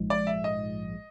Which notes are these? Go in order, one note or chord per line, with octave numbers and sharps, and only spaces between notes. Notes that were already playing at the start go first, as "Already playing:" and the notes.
Already playing: A#1 G#2 F3 G#3
D5
E5
D#5